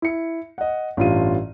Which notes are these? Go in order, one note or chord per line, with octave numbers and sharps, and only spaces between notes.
E4 C#7
D#5 F#5
A1 G2 F4 D#7